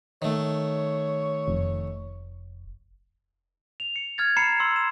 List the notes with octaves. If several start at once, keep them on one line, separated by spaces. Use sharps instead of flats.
D#3 A3 C#5
F1
F7
C#7
F6 G#6 A6
A#5 B5 C7 C#7 E7
C6 E6
E7